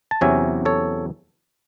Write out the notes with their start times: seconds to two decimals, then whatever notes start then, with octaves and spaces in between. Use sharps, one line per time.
0.11 A5
0.21 E2 C3 F#3 C#4 E5 G#5
0.65 A4 C#5